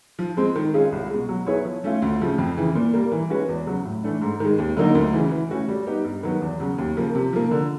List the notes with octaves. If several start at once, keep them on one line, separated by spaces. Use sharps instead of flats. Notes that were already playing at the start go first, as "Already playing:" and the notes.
F3
G#3 C4
D#3
G#3 C#4 F4 G#4
C2
B2 G#3
F#3
B3 E4 G#4 C#5
F3
A3 C#4 F4
D2
C#3 F3 A3
F2
C#3 E3
A#2
G3 A#3
E3
G#3 C#4 F#4 B4
E2
C#3 F#3
A2
E3 A3 D4
G#2
D#3 G#3
D#2
D3 F#3 A#3 D#4
D2
C#3 E3
E3
A3 C#4 F#4
G3
B3 D#4 G4
G2
D#3 F#3 B3
E2
C#3 F#3
D#2
C#3 F3 A#3
C3
F3 A#3
D3